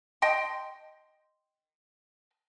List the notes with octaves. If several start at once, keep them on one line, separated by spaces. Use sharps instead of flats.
D#5 G5 A5 C6